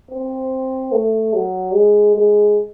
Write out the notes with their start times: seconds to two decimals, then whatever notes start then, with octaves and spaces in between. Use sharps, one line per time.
0.11 C4
0.92 A3
1.33 F#3
1.74 G#3
2.15 G#3